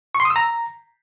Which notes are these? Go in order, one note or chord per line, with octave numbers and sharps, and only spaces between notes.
C#6
C6
D#6
E6
A#5